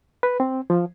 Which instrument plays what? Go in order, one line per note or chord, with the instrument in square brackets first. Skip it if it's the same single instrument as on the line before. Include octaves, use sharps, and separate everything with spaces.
[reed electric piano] B4
C4
F3